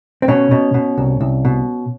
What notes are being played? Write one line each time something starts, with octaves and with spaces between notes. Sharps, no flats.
C4
B2 C#4
B2
B2
C2
C2
B2